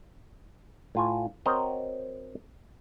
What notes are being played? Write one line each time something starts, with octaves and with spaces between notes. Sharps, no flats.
A2 F4 G#5
C4 F#4 A#4 C5 C#5 D#5